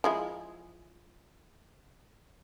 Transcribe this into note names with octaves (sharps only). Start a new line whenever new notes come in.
F3 G#3 E4